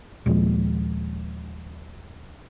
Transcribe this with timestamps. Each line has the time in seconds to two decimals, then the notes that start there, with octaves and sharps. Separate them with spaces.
0.26 D#2 A#2 F3 G#3